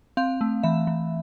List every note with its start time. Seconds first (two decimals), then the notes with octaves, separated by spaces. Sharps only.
0.17 C4 F5
0.41 A3
0.63 E3 E5
0.87 E3